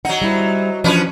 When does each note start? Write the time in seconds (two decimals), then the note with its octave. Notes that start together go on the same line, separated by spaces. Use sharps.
0.05 F#3 D#4 F#5
0.22 G3 E4 C5
0.84 E3 F3 C#4 D4 B4 C5